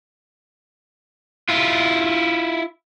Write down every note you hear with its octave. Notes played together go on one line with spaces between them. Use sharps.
E4 F4